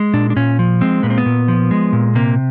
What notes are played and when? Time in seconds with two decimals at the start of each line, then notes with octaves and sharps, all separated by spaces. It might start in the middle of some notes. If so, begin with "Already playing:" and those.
Already playing: G#3
0.14 A#2 D4
0.30 D4
0.36 A#2 C#4
0.59 F3
0.81 G#3 C4
1.03 A#2 B3
1.10 C4
1.18 B3
1.26 A#2
1.48 F3
1.71 G#3
1.93 A#2
2.15 C3 A#3